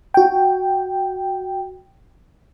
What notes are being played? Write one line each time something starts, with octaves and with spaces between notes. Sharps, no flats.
F#4 G5